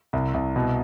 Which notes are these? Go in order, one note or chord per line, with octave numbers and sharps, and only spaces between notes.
C2
C2
B2